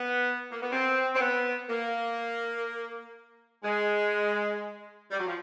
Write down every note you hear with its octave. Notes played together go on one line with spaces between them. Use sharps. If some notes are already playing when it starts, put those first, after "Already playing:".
Already playing: B3
A#3
B3
C4
C4
B3
A#3
G#3
G3
F#3
F3